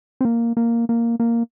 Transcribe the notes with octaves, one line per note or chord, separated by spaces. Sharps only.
C4
A#3
A#3
A#3
A#3